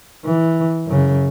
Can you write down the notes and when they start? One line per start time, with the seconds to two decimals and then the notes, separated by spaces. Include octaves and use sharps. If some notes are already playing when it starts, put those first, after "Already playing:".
0.25 E3
0.87 F#2 C#3